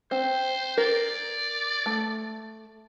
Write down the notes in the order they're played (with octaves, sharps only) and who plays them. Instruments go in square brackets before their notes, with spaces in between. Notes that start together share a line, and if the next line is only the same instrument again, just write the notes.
[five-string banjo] C4 [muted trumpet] C5
[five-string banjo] A#4 [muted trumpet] D5
[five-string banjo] A3